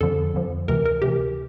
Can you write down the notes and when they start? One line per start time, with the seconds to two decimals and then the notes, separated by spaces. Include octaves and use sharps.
0.01 F2 D3 F3 A4
0.34 F2 D3 F3
0.68 D2 C3 E3 A#4
0.86 A#4
1.02 D2 C3 E3 G4